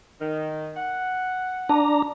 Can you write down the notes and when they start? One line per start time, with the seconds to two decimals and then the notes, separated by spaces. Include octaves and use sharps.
0.20 D#3
0.76 F#5
1.69 D4 A5 A#5